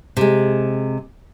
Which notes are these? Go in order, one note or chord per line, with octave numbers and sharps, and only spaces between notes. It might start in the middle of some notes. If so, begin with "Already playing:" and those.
C3 G#3